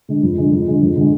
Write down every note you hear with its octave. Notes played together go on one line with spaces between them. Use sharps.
D3 G#3
F2
D3 G#3
F2
D3 G#3
F2
D3 G#3